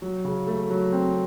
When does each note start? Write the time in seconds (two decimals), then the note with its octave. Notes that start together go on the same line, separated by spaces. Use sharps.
0.02 F#3
0.24 C#3
0.47 A3
0.70 F#3
0.92 C4